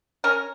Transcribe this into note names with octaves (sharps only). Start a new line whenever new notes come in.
C#4 A#4